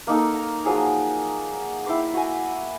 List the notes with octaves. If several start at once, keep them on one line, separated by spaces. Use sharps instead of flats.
A#3 D#4 A4
A#5
F3 F#3 G#4 G#5
E4 G5 C6 D6
F#4 G#5